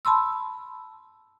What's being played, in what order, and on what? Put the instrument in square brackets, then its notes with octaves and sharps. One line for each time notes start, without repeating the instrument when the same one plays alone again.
[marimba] A5 B5 C6 E6